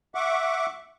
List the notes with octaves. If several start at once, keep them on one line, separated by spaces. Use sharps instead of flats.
E5 F#5 C#6 D6